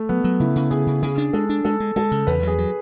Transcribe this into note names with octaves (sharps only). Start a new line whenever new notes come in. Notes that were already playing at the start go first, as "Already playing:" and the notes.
Already playing: A3
F#3 B3
F#3
C#3 E4
C#3
C#3 G#4
C#3
C#3 G#4
D4
G#3 A4
D4
G#3 A4
G#3
G#3 A4
C#3
E2 B4
F#3 G#4
F#3